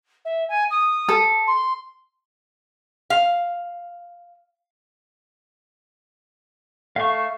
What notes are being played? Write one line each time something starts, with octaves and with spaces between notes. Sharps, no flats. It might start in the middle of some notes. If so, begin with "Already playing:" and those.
E5
G#5
D#6
A4
C6
F5
A3 F5 C#6